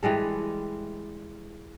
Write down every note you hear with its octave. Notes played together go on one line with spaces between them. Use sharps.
E3 G3 G#3 A4